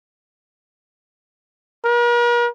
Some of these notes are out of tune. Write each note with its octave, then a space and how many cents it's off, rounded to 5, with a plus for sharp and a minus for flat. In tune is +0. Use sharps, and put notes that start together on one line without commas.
A#4 +45